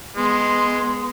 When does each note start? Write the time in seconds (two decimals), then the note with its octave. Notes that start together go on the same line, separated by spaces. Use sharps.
0.17 G#3 B3 C6